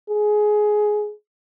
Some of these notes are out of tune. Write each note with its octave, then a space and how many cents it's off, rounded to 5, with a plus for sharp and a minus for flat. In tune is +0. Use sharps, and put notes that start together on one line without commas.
G#4 +15